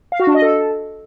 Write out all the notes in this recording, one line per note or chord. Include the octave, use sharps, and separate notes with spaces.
F5
F#4
D4
D#5
A4